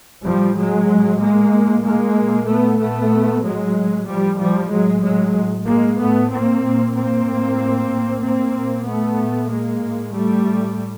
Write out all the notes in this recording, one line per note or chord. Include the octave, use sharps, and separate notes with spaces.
A2 F3 G3
F#3 G#3
A2
G#3 A#3
A2
G#3 A#3
A#2
A3 B3
A#2 A3 B3
A2 F#3 G#3
A2 F3 G3
F3 G3
A2 F#3 G#3
F#3 G#3
A2
G#3 A#3
A2 A3 B3
A#3 C4
A#2
A#3 C4
A2
A2
A#3 C4
A#2
A3 B3
A#2
G#3 A#3
A2
G3 A3
A2